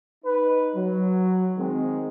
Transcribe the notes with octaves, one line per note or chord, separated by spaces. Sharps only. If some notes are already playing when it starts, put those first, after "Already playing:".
D#4 B4
F#3
D#3 G#3 C4